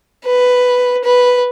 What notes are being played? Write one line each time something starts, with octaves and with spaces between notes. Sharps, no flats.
B4
B4